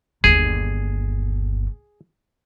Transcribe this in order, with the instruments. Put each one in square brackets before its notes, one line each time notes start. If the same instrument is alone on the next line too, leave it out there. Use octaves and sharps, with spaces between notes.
[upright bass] G1 D#2 [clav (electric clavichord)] G#4